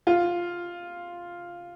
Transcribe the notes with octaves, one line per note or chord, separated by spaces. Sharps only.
F4